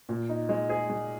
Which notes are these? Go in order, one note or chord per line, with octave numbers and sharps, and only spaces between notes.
A#2
D#4
G#3
G#4
G#3